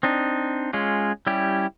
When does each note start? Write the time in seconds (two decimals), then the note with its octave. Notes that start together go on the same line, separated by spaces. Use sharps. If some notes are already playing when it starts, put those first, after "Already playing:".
0.03 C4 D4 D#4
0.73 G#3 C#4 F4
1.27 G3 C#4 E4 G4